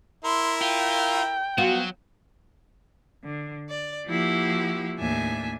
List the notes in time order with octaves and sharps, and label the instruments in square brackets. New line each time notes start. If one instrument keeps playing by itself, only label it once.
[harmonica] E4 A#4 [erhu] C6
[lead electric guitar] F4 [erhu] G5
[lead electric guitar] F#3 [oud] B3 F4 F#4
[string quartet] D3
D5
F3 A#3 E4 F#4 G4
D#2 A2 D4 E5 G#5